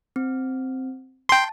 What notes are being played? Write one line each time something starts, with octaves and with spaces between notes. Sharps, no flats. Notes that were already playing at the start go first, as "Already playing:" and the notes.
C4
G5 A5 C6